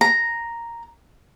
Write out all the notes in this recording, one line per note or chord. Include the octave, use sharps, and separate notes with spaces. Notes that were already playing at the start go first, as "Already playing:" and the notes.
A#5